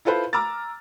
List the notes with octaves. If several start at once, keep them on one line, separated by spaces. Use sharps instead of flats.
E4 F4 A4 B4 C5
A#5 D6 E6 F6 A6